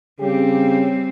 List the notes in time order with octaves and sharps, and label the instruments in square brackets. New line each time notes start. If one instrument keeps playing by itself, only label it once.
[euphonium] C#3 [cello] G3 C4 [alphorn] G4